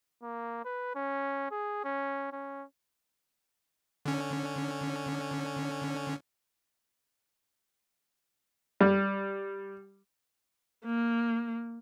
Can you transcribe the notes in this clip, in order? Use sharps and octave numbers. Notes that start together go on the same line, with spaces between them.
A#3
B4
C#4
G#4
C#4
C#4
D3 C#4
G3
A#3